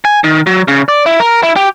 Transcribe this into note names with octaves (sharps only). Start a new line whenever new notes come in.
G#5
D#3
F#3
C#3
D5
E4
A#4
E4
G4